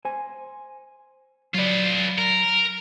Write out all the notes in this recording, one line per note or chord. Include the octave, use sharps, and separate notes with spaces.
C5 G#5
F#3 F4 B4 D5
A#4